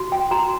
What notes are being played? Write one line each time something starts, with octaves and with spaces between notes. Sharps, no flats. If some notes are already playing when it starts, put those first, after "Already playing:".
Already playing: F#4
G5
F#4 A#5